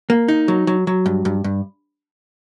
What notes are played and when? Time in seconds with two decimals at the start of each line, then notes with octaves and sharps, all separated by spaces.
0.10 A#3
0.28 D#4
0.48 F#3
0.67 F#3
0.87 F#3
1.06 G2
1.25 G2
1.44 G2